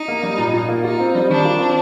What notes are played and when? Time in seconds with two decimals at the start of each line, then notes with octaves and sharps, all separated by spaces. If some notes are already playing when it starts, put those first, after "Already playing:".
Already playing: D#4
0.08 A#3
0.23 G3
0.38 A#2
0.54 A#2
0.69 A#3
0.84 D#4 F4
1.00 C4
1.15 G3
1.30 D#3 D4
1.45 F4
1.60 C4